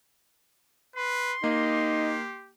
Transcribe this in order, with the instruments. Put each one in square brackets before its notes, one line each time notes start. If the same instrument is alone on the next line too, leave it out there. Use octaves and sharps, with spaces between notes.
[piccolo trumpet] B4 [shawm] C6
[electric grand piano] A#3 [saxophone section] D#4 [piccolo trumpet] G4